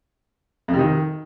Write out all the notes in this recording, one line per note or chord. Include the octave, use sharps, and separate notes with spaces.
F2
C3
D#3